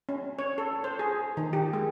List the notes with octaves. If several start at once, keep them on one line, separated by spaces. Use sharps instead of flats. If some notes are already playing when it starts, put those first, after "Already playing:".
C#4
C#5
A4
C5
G#4
D#3
G4
G#3